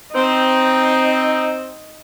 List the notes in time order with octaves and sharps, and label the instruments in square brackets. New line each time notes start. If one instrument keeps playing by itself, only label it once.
[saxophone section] C4 [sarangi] D#4